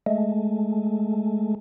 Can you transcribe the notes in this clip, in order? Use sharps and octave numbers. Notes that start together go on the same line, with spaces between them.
G#3 A3